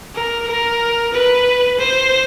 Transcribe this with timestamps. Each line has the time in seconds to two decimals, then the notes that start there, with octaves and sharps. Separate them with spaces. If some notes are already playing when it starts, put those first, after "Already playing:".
0.15 A#4
0.47 A#4
1.13 B4
1.79 C5